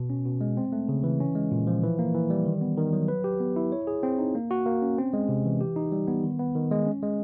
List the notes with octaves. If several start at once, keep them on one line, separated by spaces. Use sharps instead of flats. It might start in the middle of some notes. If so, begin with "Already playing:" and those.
Already playing: B2
C#4
B2
G#3
C4
A3
C#3
E3
C#4
G#3
A#2
F3
E3
A#3
E3
G3
D#3
B3
D#3
F#3
B4
G4
B3
E4
C#5
G#4
C4
D#4
A#3
F#4
A#3
C#4
C4
G#3
C3
E3
G4
D#4
G3
B3
D#3
B3
D#3
G#3
C#4
G#3